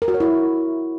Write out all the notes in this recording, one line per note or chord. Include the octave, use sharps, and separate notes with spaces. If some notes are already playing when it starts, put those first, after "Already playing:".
A#4
F#4
C#5
E4